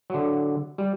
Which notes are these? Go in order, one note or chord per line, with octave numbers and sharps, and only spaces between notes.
D3 F#3
G3